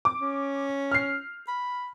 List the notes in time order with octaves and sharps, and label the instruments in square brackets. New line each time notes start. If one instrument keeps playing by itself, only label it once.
[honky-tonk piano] D6
[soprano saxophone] C#4
[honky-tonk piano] F6 C7
[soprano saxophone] B5